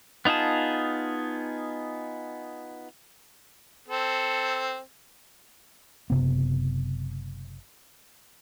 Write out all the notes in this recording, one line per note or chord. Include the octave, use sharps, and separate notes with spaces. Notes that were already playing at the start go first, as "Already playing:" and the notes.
B3 D#4 F4 G#4 A5
C4 A4
F#1 C3 B3